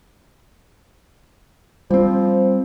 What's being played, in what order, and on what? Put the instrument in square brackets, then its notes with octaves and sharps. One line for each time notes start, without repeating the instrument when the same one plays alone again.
[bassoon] F3 [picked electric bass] G3 C4